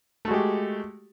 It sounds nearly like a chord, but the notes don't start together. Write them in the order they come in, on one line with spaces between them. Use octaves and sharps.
A3 F#4 G#3 G4